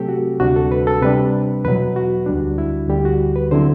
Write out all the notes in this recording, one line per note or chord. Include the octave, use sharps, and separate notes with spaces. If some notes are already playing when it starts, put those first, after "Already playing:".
Already playing: C3 F#3 A3 C4 G4 A4
F#4
D2 C3 G3 D4 F#4
A4
B4
A4
C3 G3 D4 B4
E2 B2 F#3 B4
F#4
D2 D3 G3 D4
E4
D2 D3 G3 G4
F#4
B4
D3 F#3 C4 E4 C5